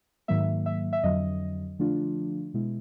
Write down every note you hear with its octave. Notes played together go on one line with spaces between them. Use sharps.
G#2 D#3 F#3 A#3 E5
E5
E5
F2 D3 F#3 D#5
D3 F3 A3 D4 F4
B2 G#3 B3 E4